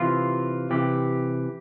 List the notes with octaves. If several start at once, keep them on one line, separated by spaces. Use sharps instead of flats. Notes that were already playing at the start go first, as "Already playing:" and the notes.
Already playing: C3 E3 F4
C3 E3 G4